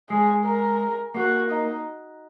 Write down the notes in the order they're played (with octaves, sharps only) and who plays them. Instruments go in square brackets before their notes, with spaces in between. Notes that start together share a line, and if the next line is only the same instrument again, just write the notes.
[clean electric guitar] G#3 [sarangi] G#4
[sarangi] A#4
[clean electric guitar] A#3 [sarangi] F#4
[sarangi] D#4